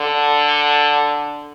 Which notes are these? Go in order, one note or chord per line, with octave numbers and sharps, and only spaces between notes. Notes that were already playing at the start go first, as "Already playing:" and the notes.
Already playing: D3